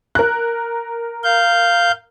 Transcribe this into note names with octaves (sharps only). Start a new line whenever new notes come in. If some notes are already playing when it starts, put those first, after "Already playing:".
A#4 F#6
F5 G6